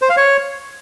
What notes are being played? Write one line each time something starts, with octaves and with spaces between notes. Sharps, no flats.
C5
F5
C#5